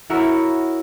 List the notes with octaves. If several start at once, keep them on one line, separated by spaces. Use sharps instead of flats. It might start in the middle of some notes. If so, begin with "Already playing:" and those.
E4 F#4 A#4 C#5 C#6 E6